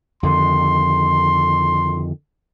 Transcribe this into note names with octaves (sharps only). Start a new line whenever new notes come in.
F2 D3 D#3 C6